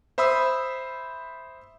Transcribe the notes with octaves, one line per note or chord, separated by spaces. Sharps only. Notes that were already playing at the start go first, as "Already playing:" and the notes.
C5 E5 B5 D#6 E6